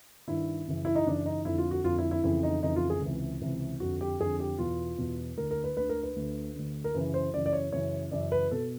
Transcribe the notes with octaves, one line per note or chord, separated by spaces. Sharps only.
G2 D#3 E4
F#2 C#3 E3
E4
D#4
F#2 C#3 E3 D4
D#4
F2 D3 E4
F4
F#4
F2 D3 F4
E4
E4
F2 C#3 E3 E4
D#4
F2 C#3 E3 D#4
F4
G#4
C#2 C3 E3
C#2 C3 E3
F2 D3 F#4
G4
F2 D3 G#4
G4
E2 B2 F4
E2 B2
D2 D3 A#4
A#4
B4
D2 D3 B4
A#4
B4
D2 D3
D2 D3
A#4
F#2 C#3 E3 B4
C5
F#2 C#3 E3 D5
D5
C#5
F#2 C#3 E3 C#5
F#2 C#3 E3 D5
B4
B2 A4